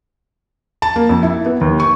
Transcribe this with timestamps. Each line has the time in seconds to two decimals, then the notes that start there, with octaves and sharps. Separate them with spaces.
0.82 A5
0.96 A#3
1.09 F2
1.23 E4
1.46 B3
1.61 D#2
1.80 C#6